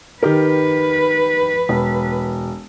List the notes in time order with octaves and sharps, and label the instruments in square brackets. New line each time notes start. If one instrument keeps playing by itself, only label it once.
[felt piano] D#3 G4 A#4 [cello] B4
[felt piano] E1